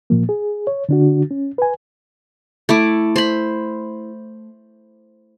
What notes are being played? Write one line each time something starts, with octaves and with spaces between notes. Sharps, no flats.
A#2 F3 A#3
G#4
C#5
D3 D4 F#4
C#4
B4 G#5
A3 E4 D6
C5 B5